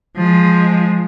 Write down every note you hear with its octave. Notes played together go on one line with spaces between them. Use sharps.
F3 G#3